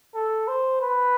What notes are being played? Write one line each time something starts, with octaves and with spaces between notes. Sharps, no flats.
A4
C5
B4